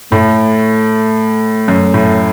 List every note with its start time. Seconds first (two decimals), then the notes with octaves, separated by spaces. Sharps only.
0.12 A2 A3
1.68 F#2
1.94 A2